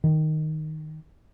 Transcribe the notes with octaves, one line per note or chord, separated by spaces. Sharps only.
D#3